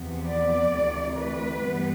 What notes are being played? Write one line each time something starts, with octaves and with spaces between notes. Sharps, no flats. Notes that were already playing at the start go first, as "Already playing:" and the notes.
Already playing: E2 C3 F3 B3
D5
D2 C3 E3 A3
B4
G2 E3 G3 B3